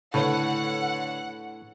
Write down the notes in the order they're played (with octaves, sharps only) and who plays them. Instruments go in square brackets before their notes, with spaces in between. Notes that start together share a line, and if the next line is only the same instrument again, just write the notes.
[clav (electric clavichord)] A2 [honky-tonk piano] D3 B4 C#5 [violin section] F#5